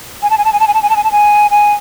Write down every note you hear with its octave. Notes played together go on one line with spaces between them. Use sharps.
G#5
A5
G#5
A5
G#5
A5
G#5
A5
G#5
A5
G#5
A5
G#5
G#5